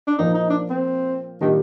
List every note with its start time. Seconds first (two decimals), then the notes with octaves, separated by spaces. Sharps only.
0.07 D4
0.18 A#2 F3 A#3 D#4
0.34 D#4
0.49 D4
0.70 C4
1.41 A#2 D#3 G3 D4 G4 A#4